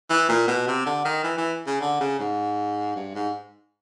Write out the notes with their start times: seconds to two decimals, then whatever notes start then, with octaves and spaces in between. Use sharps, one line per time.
0.10 E3
0.29 A#2
0.47 B2
0.67 C3
0.86 D3
1.05 D#3
1.24 E3
1.38 E3
1.67 C#3
1.81 D3
2.00 C#3
2.19 G#2
2.96 G2
3.15 G#2